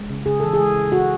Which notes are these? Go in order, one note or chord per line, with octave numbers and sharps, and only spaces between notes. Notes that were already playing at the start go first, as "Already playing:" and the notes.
Already playing: G#3
C#3
C#3 G#4
E3 A4
G#4
G#3
C#3
C#3 F#4